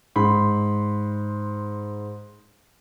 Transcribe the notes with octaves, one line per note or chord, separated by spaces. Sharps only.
G#2 B5 C6